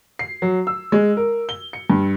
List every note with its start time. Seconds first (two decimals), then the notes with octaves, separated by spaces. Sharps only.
0.19 C7
0.42 F#3
0.67 E6
0.92 G#3
1.17 A#4
1.49 G7
1.73 C#7
1.90 G2